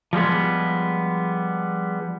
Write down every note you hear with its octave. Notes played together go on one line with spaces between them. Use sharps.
F3 G3 G#3 B3